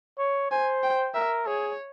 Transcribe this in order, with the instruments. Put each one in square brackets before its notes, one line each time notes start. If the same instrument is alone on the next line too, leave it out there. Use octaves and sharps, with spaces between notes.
[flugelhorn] C#5
[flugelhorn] C5 [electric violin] G#5
[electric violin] G5
[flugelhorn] A#4 [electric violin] E5
[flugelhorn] G#4 [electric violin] C#5